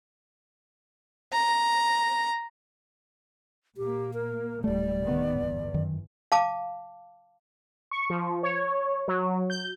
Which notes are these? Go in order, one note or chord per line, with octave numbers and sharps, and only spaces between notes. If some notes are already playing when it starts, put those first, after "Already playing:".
A#5
A#2 A#3 G4
A#4
D1 G3 A3 D5
C2 D#3 B3
G1 E2
F#2 D#3
F5 A5 D6
C#6
F3
C#5
F#3
G6